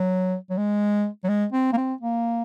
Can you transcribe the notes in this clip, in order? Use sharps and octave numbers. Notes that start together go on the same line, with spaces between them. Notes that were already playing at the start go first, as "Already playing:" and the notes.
Already playing: F#3
F#3
G#3
F#3
G#3
C4
A#3
C4
A#3